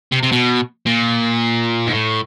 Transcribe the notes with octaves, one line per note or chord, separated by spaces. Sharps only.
C3
C3
B2
A#2
G#2
A2